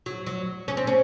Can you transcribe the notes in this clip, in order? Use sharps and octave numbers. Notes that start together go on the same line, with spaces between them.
F#3
F#3
C#4
C4
C#4